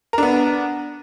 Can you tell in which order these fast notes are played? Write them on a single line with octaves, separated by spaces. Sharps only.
A#4 D4 B3